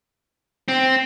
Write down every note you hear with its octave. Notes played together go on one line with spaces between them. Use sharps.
C4